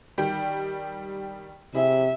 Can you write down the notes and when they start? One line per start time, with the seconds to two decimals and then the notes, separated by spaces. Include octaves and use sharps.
0.18 D#3 G3 G5
1.75 C3 E4 G#4 E5